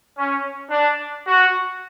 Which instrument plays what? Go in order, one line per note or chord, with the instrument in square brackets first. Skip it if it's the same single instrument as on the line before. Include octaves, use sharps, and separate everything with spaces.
[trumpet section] C#4
D4
F#4